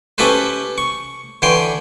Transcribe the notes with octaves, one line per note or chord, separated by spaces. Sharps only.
C#4 E4 G4 A4 B4 C5
C#6
D3 E3 C#5 G5 C6